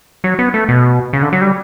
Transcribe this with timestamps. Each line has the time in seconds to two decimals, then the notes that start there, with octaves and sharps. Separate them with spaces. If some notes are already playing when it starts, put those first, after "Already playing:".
0.24 F#3
0.39 B3
0.54 A3
0.69 B2
1.13 C#3
1.22 D3
1.33 F#3
1.41 G3